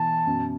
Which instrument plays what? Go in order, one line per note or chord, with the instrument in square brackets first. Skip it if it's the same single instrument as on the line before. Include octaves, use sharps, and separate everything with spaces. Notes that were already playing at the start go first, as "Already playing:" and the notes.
Already playing: [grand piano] B2 E3 [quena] A5
[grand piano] F#2 B2